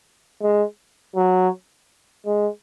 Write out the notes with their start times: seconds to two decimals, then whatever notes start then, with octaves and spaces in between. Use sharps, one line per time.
0.42 G#3
1.16 F#3
2.26 G#3